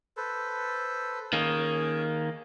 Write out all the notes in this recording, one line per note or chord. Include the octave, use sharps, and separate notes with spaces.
A4 B4 C5
D#3 A#3 C#4 G#4